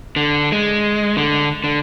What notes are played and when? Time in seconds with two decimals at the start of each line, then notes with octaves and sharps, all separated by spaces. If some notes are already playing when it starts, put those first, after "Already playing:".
0.16 D3
0.52 G#3
1.17 D3
1.64 D3